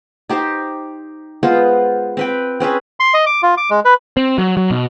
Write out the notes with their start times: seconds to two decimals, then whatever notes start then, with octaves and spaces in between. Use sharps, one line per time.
0.29 D#4 G4 C5
1.43 G#3 B3 F4 C5
2.17 C4 B4 G5
2.60 C4 C#4 G#4 B4
3.00 C6
3.14 D#5
3.26 D6
3.43 F4
3.58 D6
3.70 G#3
3.85 B4
4.17 C4
4.38 F#3
4.57 F#3
4.71 B2